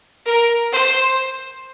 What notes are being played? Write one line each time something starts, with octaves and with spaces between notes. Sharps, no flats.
A#4
C5